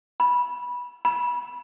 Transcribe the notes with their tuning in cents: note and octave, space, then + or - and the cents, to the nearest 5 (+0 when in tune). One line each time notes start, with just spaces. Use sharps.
B5 -15
B5 -25